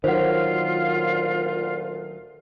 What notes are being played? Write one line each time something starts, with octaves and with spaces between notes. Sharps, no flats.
D2 A#2 D#3 F#3 F4 C5 F#5